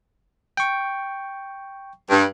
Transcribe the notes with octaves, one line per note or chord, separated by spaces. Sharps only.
G5 C#6
G2